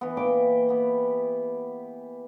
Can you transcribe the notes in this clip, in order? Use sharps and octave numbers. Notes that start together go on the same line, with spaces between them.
E3 B3
A#2 E3 G5 D6
B3 G4